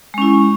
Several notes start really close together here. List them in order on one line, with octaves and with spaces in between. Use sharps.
G#3 C#4 E4